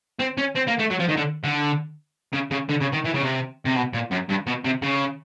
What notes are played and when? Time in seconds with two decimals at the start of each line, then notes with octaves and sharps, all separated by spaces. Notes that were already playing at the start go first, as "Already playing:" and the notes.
0.19 C4
0.37 C#4
0.55 C4
0.67 A#3
0.79 A3
0.90 F#3
0.99 F3
1.08 D#3
1.17 D3
1.44 D3
2.33 C#3
2.51 C#3
2.69 D3
2.80 C#3
2.92 D#3
3.04 E3
3.14 C#3
3.22 C3
3.65 C3
3.76 B2
3.93 A#2
4.11 F#2
4.29 G2
4.47 B2
4.64 C3
4.82 C#3